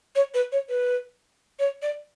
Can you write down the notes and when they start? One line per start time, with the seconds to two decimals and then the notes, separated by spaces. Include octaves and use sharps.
0.16 C#5
0.34 B4
0.52 C#5
0.69 B4
1.59 C#5
1.82 D5